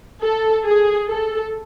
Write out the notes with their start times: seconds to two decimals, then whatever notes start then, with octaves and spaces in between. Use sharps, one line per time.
0.22 A4
0.65 G#4
1.09 A4